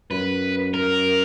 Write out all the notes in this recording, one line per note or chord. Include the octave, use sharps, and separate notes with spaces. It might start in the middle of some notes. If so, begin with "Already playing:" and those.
F#2 B4
A#4